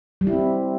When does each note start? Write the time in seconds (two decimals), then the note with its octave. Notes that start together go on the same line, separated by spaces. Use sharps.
0.21 G3
0.27 E4
0.33 C4